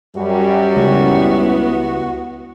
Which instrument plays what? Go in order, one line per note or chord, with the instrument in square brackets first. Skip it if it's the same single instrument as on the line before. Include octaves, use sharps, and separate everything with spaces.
[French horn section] F#2 G3 [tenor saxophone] F#4
[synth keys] C#2 [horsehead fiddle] B3 E4